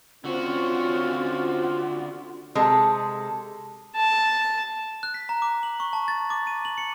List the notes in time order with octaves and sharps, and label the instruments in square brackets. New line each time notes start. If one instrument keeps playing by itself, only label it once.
[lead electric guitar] D3 F#4 [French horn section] C4 C#4 [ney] F4
[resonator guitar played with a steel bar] C3 G#3 A4
[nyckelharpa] A5
[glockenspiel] F#6
B6
A#5
D6
F#7
C#6
A5
A6
D6
D#7
F#7
C#7